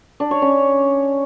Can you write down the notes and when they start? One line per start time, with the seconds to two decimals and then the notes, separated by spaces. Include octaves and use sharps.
0.20 D4
0.31 C#5
0.42 C#4